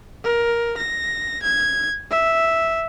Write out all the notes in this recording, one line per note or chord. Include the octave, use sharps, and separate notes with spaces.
A#4
A#6
G#6
E5